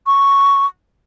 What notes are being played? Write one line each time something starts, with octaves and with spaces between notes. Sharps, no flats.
C#6